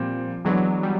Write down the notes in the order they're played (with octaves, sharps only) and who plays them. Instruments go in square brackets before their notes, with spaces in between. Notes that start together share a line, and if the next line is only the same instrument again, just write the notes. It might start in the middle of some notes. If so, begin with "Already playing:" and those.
Already playing: [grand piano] A#2 G3 C4 [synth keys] F3
[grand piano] E3 G#3 B3 D4 [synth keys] F#3
[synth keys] G3